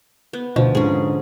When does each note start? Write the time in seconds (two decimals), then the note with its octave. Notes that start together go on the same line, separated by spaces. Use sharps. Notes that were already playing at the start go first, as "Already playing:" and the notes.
0.33 B3
0.56 D2 B2 F3
0.75 G#2 D3 C#4 G#4